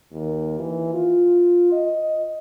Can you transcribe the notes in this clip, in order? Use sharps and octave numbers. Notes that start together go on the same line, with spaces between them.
D#2
E3
F4
D#5